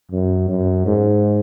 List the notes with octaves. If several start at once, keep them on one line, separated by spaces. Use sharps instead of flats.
F#2
F#2
G#2